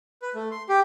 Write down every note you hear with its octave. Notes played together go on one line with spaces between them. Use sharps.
B4
A3
C6
G4